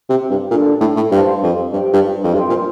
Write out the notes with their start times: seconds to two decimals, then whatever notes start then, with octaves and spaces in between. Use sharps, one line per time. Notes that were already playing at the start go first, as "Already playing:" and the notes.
0.09 C3
0.30 G2
0.51 A#2 D4 A4 D5
0.81 A2
0.96 A2
1.11 G2 C5 F5 A5 C6
1.43 F2
1.72 G2 G4 C5 G5
1.93 G2
2.24 F2
2.34 G2 C5 G5 C6
2.49 A#2